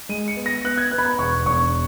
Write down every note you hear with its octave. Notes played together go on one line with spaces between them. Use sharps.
G#3 D#7
C#7
B3
A#6
B3 F#6
G#6
B3 F#6
B5
A#5
E1 C#6
E1 C#6